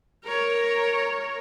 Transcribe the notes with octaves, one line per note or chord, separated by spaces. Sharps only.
A#4 C#5